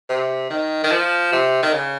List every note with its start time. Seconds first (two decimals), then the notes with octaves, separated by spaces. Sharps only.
0.09 C3
0.50 D#3
0.84 D#3
0.91 F3
1.32 C3
1.63 D#3
1.74 C#3